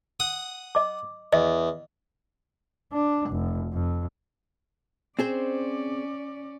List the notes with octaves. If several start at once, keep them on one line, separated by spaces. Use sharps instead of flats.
F#5 D#6
D#5 D6
E2 D#5
D4
F1
F2
C4 C#4 G#4 C5 D5